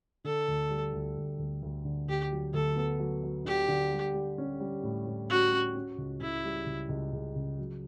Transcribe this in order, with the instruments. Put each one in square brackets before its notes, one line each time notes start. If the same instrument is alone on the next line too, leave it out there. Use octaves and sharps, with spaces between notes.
[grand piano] D3 [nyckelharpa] A4
[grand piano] D2
G3
D2
D2
D2
D2
D3
[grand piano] D2 [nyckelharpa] G4
[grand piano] F#3
[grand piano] D2 [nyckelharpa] A4
[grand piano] B3
F#3
F#3
[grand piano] D3 [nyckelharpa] G4
[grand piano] D3
G3
G3
C#4
G3
A2
A2
[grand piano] C#4 [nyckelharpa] F#4
[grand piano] C#4
C#4
C#2
[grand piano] C#3 [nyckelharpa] E4
[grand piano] G3
C#2
C#2
C#3
C#3
F#3